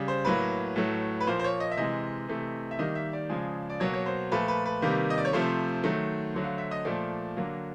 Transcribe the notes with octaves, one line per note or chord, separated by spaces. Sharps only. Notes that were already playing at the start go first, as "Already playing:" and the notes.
Already playing: C#3 G3
C5
A2 F#3 A#3 B4
A2 F#3 A3
B4
A#2 F3 A#3 C5
C5
C#5
D#5
E5
C3 E3 G#3 D#5
C3 E3 A3
E5
D#3 G3 A#3 D#5
E5
D5
C#3 F3 G#3
D5
B2 F#3 A#3 C#5
C#5
C5
A#2 F3 A3 B4
B4
B4
C3 D#3 G3 A#3
D#5
D5
C#5
C3 F3 A3 C5
D#3 F#3 A3
D3 F#3 A3
F5
E5
D#5
A#2 F3 A3 D5
D3 F#3 A#3